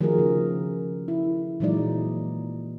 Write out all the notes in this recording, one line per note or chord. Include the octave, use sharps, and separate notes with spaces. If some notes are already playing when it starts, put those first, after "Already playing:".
D#3 F3 A3 F#4 G#4 A#4
C#3
E4
A#2 E3 F#3 G#3 D#4 D5